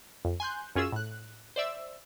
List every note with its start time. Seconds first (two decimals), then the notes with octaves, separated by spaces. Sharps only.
0.25 F2
0.40 G#5 C6 F#6 G6
0.75 F#2 C#4 F4 G#4 E6 E7
0.92 A2 F#6
1.56 C5 D5 E5 E6